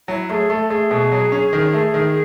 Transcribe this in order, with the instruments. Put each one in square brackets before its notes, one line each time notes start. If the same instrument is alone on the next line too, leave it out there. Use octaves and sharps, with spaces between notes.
[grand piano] F#3 [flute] E4
[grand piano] A3 [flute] G#4
[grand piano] A3 [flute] A4
[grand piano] A3 [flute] G#4
[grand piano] B2
F#3
C#4
D#3
A3
D#3